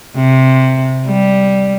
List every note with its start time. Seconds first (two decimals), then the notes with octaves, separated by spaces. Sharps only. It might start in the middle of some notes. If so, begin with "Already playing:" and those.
0.16 C3
1.07 G3